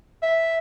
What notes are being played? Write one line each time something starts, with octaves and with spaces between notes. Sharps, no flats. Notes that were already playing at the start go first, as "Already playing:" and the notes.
E5